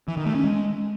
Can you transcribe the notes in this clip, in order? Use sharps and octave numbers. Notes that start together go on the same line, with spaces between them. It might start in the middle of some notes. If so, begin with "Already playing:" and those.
E3
D#3
A3
C#4
G#3